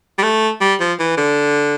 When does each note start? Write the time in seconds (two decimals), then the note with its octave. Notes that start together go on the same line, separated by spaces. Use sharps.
0.18 G3
0.23 A3
0.61 G3
0.80 F3
0.99 E3
1.17 D3